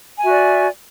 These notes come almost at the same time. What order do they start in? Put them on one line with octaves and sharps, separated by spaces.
G#5 F#4 E5 D5